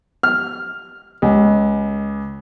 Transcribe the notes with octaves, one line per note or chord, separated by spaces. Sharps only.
F6
C#2